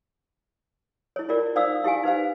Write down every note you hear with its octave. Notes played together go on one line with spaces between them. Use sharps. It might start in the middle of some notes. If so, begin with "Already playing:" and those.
E4 C#5
E4 F4 A#4 D5
D#4 C5 D5 F5 D#6 E6
E4 G4 F5 G#5
D#4 B4 C5 F5